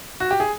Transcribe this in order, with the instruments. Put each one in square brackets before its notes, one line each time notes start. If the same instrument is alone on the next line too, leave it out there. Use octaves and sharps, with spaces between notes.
[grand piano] F#4
G4
G#4